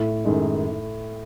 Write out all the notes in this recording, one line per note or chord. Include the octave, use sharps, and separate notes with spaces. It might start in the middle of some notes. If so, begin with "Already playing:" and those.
Already playing: A2
F#2 D#3 G#3 D#4